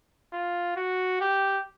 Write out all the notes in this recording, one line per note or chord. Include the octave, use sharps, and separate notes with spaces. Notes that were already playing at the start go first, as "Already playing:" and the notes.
F4
F#4
G4